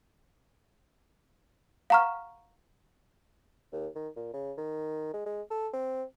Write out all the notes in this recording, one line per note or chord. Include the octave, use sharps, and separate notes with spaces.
F5 F#5 A#5 C#6 F6
D#2
D#3
A#2
C#3
D#3
G#3
G#3
A4
C4